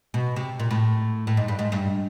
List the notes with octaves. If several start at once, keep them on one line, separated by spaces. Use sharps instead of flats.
B2
C3
A#2
A2
A2
G#2
G2
G#2
G2